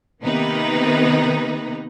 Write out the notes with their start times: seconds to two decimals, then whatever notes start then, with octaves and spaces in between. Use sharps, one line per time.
0.23 C3 D#3 A#3 B3 D#4 B4